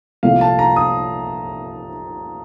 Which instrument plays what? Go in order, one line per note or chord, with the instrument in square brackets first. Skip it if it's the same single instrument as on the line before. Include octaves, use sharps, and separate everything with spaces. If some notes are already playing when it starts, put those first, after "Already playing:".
[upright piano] C2 A#2 F3 A3 [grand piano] F5
[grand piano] A5
A#5
D#6